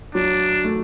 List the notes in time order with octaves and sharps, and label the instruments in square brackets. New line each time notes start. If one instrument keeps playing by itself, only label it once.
[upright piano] F#3 [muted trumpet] D4
[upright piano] A3